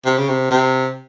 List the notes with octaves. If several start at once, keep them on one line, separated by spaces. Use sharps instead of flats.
C3
C#3
C3
C3